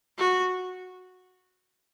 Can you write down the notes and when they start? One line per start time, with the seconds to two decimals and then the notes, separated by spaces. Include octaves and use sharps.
0.18 F#4